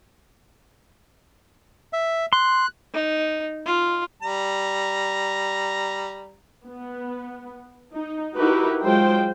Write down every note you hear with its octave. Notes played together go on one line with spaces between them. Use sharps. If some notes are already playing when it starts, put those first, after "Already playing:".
E5
C6 F#6
D#4
F4
G3 A#5
B3
D#4
D#4 E4 F#4 G4 A#4 B4
F#3 G#3 F4 C5 G5